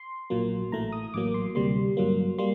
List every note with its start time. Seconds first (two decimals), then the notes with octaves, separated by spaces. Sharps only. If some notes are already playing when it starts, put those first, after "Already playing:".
Already playing: C6
0.30 A#1 A#2 F#3 A#3
0.72 A1 A2 A3 A#5
0.92 D#6
1.14 A1 A2 F#3 A#3 D6
1.34 C6
1.55 D2 C3 G3 A#3 C6
1.97 G2 F#3 A#3
2.38 G3 A#3 C6